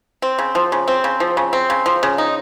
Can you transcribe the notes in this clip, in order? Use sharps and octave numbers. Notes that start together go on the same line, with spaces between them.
C4
C#3
F3
C#3
C4
C#3
F3
C#3
C4
C#3
F3
C#3
D#4